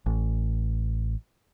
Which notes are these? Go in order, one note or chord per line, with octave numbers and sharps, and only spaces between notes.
A1